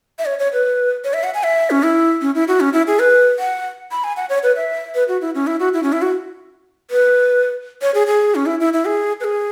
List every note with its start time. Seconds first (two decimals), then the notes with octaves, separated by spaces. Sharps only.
0.19 E5
0.26 C#5
0.39 C#5
0.53 B4
1.04 C#5
1.14 E5
1.24 F#5
1.34 G#5
1.44 E5
1.71 C#4
1.83 E4
2.22 C#4
2.35 E4
2.48 F#4
2.60 C#4
2.73 E4
2.87 G#4
2.99 B4
3.39 F#5
3.91 B5
4.04 G#5
4.17 F#5
4.30 C#5
4.43 B4
4.56 E5
4.95 B4
5.08 F#4
5.21 E4
5.35 C#4
5.47 E4
5.60 F#4
5.74 E4
5.83 C#4
5.93 E4
6.02 F#4
6.91 B4
7.82 C#5
7.94 G#4
8.07 G#4
8.35 C#4
8.46 E4
8.60 E4
8.73 E4
8.85 G#4
9.20 B4
9.24 G#4